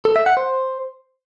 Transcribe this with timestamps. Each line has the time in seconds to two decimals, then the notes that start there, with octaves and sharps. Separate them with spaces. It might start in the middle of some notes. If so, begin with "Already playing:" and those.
0.05 A4
0.16 E5
0.26 F#5
0.37 C5